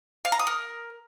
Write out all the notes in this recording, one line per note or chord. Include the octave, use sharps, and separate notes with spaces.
F5
A#5
D#6
A#4